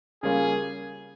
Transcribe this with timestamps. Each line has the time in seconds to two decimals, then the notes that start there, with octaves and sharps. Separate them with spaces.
0.23 C#3 G3 A#3 C#4 F4 G#4